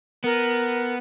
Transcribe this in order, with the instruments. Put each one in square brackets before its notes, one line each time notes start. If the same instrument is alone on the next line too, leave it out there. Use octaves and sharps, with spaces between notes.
[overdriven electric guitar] B3 [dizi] A#4